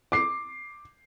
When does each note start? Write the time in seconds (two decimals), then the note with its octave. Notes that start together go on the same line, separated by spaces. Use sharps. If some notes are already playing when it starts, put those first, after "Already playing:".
0.12 D6 C7